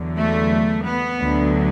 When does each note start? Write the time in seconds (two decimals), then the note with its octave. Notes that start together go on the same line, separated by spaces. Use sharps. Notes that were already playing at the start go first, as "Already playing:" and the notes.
Already playing: E2 D3 F#3
0.19 A3
0.86 B3
1.19 D2 D3 F#3